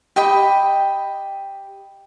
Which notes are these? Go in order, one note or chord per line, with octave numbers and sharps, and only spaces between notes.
G4 D#5 G5 B5